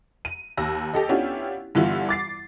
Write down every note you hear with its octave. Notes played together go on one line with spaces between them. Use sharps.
D#7
D#2 E6 A#6
G4 A4 D#5
B3 C#4 D4 E4 F4 G4
G2 D3 E3 B3 E4 F4
D6 A6 C7